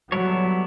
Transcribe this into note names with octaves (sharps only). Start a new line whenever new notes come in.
F#3 G3 B3 E4 A4 C#5